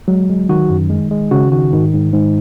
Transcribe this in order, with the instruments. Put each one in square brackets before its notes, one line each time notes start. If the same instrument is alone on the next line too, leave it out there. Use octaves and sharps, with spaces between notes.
[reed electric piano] F#3 [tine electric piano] G#3
[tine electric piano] G#3
[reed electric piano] D#3 [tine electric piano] F#4
[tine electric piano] F#2
G#3
G#3
[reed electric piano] C#3 [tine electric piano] F#4
[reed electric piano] D#3 [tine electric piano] F#4
[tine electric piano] G#2 [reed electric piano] D#3
[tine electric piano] G#2
G#2